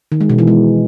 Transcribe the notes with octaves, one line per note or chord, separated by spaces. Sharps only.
D#3
G#3
B2
E3
G#3